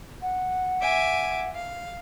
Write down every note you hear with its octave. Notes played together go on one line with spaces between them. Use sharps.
F#5
E5 G#5 D6
F5